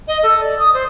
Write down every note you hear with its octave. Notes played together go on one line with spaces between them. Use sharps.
D#5
A4
D5
D#6
C5